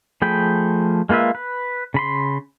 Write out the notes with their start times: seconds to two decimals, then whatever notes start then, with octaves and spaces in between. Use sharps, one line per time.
0.22 F3 A3 G#4 G5 B5
1.09 G#3 A#3 F4 B4 E5
1.35 B4
1.94 C#3 B5 C6